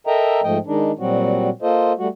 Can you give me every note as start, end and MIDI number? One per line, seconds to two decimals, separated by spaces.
0.07 0.41 69
0.07 0.41 70
0.07 0.41 75
0.07 0.41 76
0.07 0.41 79
0.07 0.41 82
0.44 0.58 44
0.44 0.58 53
0.44 0.58 57
0.44 0.58 75
0.44 0.58 79
0.67 0.92 51
0.67 0.92 56
0.67 0.92 62
0.67 0.92 63
0.99 1.49 46
0.99 1.49 54
0.99 1.49 55
0.99 1.49 60
0.99 1.49 66
1.62 1.92 58
1.62 1.92 65
1.62 1.92 69
1.62 1.92 72
1.62 1.92 75
1.98 2.08 55
1.98 2.08 57
1.98 2.08 66